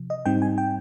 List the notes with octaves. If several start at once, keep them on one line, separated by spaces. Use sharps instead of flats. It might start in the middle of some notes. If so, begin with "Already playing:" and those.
Already playing: C3 F3
D#5
G#2 G3 C4 D#4 G5
G#5
G5